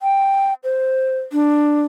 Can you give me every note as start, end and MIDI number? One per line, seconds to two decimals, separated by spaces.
0.01 0.54 79
0.64 1.19 72
1.33 1.82 62